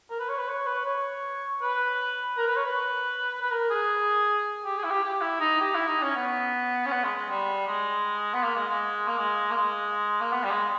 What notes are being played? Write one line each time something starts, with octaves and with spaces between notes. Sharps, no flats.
A#4
B4
C#5
B4
C#5
B4
C#5
B4
A#4
B4
C#5
B4
B4
A#4
G#4
G4
G#4
E4
G4
G4
E4
D#4
G4
E4
D#4
C#4
B3
C#4
B3
G#3
G#3
G3
G#3
B3
A#3
G#3
G#3
A#3
G#3
A#3
G#3
A#3
B3
G3
G#3